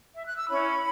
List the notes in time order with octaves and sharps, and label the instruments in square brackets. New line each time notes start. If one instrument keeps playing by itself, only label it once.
[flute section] E5
F#6
E6
C#4 E4 C#5 B5